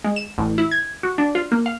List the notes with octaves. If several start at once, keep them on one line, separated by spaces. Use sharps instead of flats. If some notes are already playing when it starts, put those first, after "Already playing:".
G#3
E7
A1
E4
G#6
F#4
D4
F4
A#3
F5